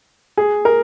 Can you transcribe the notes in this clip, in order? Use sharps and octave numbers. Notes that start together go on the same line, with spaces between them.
G#4
A#4